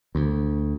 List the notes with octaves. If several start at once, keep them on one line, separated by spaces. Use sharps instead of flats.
D2